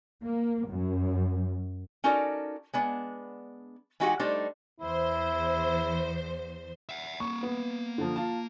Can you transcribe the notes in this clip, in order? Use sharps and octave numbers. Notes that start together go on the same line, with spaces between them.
A#3
F#2
C#4 D#4 F#4 A4 A#4 D5
G#3 B3 D4
E3 G#3 D#4 F#4 G4 F#5
G3 A3 D4 D#4 A4 C5
E2 E4 C5
E5 F#5
A#3 F#5 C#6
B3
D3 F3
F4 A5